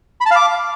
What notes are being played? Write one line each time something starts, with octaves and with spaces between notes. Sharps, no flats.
B5
A5
F5
D6